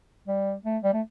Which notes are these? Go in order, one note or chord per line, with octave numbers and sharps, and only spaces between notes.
G3
A3
G3
A3